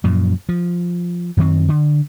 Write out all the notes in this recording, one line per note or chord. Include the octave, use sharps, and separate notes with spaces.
F#2 A#2 F3
F3
F#2 D#3 C4
D3